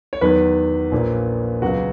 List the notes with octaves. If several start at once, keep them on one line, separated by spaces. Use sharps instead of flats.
C#5
E2 D#3 F#3 B4
A#1 A#2 A#3
C#2 C#3 F#3 B3 F#4